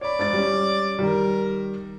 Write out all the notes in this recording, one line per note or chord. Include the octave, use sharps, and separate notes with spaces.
C#5 D5 B5
G#2 A6
G3 C#4
D#3 G3 A#4